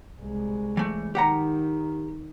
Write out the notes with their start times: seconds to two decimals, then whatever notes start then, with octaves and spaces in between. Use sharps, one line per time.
0.21 C2 G#3
0.77 E3 A3
1.15 D#3 G4 F#5 A#5